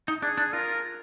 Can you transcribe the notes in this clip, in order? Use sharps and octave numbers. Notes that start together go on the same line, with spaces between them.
D#4
D4 G#4
D4
F4 A#4